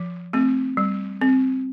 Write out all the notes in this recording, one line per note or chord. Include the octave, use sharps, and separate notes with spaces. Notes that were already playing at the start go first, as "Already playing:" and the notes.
Already playing: F3
A3 C4
G3
C4